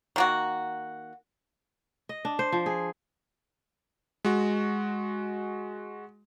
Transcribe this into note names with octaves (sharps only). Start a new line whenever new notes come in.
D#3 A#3 F#4
D#5
D4
C5
F3
G#4
G#3 F#4